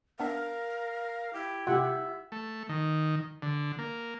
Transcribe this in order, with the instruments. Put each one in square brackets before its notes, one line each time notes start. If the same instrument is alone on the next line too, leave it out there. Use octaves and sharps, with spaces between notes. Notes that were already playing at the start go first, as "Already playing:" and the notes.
[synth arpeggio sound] B3 D4 E5 [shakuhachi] A#4 [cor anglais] F5
[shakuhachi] E4 [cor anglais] G4
[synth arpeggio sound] C3 A3 F4 [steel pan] G4 F#5 [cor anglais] E5
[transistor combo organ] A3
D#3
D3
A#3